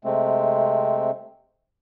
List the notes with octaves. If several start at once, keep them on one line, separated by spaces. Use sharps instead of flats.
C3 G#3 A3 C4